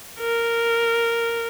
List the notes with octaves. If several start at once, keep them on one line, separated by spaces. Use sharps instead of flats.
A#4